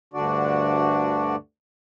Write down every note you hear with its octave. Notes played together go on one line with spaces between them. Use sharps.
D2 G2 D3 D4 F#4 D5